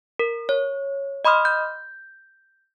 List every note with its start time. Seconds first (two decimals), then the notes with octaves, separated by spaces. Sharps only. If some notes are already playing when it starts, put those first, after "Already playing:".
0.19 A#4
0.49 C#5
1.25 D#5 B5 C6 D#6 F6
1.45 G6